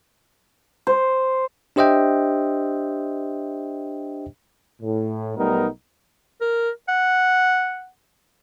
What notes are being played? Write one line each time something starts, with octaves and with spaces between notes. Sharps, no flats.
C5
D4 G4 C5 D#5 E5 G5
A2
B1 G3 A3 B3 D#4 A#4
A#4
F#5